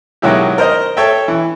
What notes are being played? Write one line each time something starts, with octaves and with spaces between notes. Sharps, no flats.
B2 D#3 F#3 G#3 E4 G4
A#4 C5 D#5
A4 C#5 E5 G5
E3